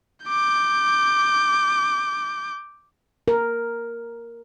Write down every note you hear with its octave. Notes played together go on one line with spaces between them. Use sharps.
D6 G6
A#4